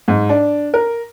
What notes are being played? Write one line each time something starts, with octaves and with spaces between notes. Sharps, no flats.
G#2
D4
A#4